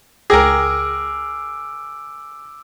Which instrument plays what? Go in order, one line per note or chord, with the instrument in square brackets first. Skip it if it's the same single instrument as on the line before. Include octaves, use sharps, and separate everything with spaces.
[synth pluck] C#2 G5 A#6 [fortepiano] G#4 A#4 [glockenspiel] D6 E6 D7